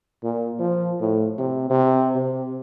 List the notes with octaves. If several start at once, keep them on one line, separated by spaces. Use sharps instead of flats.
A#2
F3
A2
C3
C3
C3